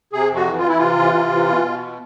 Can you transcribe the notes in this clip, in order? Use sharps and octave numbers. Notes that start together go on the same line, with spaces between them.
C3 G#4
F2
F#4
E3
F4
E3 E4
C3 F4
E3
C3
E3
B2
B2